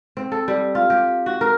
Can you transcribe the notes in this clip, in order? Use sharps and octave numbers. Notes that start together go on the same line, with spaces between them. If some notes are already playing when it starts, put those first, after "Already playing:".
C4
A4
G3
F4
G4
F#4
A#4